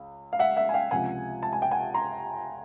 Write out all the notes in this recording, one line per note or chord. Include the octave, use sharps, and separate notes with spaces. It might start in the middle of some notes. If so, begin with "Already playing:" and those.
Already playing: C#2
F5
E5 F#5
E5 F#5
G#5
F5 G5
C#2 C3 F3 F#5 G#5
A5
G#5
G5
F#5 G#5
A#5 C6